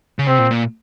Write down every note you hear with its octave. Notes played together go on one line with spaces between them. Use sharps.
C#3
C3 C4
A#2
A#2